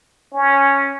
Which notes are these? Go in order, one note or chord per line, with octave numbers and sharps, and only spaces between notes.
C#4